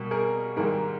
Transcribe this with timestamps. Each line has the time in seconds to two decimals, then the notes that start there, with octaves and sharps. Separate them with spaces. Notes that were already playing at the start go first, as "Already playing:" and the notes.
Already playing: B2 G3 A#3
0.11 G#4 A#4
0.56 G#2 D#3 G3 A#3 G#4 A#4